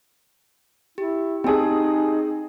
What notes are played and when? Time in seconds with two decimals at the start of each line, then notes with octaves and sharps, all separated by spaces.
0.98 E4 G4
1.44 C4 D#4 G4 G#4 A5